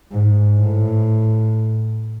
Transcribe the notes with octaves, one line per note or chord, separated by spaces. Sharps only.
G#2
A2